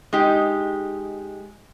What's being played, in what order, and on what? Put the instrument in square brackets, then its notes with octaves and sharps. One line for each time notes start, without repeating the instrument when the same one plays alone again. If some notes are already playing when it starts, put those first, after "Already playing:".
[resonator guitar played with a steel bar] G#3 D#4 G4